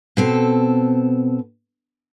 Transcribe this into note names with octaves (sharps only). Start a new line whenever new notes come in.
B2 C4 A4